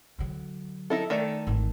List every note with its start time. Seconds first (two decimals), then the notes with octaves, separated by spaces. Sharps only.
0.19 D3 F#3
0.90 D#4 E4 A4
1.10 D#3 A3 D5
1.47 G#1 E3